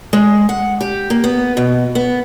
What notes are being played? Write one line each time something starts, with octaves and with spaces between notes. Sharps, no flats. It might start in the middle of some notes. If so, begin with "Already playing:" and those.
G#3
F#5
G4
A#3
B3
B2
B3